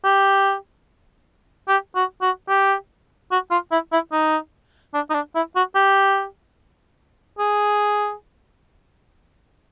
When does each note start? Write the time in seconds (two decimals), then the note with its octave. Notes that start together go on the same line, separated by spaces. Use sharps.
0.05 G4
1.68 G4
1.95 F#4
2.22 F#4
2.49 G4
3.32 F#4
3.51 F4
3.72 E4
3.92 E4
4.12 D#4
4.94 D4
5.10 D#4
5.14 D4
5.35 E4
5.56 F#4
5.75 G4
7.39 G#4